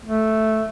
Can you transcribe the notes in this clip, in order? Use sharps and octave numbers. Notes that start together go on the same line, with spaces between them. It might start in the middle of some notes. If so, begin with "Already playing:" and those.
A3